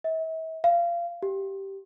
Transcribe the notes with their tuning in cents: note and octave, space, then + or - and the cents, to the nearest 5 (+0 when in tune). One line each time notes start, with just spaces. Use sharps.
E5 -40
F5 -25
G4 -10